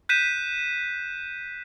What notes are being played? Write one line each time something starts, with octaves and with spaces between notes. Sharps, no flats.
F#6 G6 B6 D#7 E7